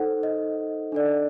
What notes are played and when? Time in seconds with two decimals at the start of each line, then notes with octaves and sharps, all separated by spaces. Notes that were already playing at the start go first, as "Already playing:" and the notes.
Already playing: D#4 A4 C5 F#5
0.23 D#5
0.92 D4 A4 D5